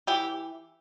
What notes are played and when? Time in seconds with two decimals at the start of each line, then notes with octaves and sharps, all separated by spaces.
0.07 E3 G4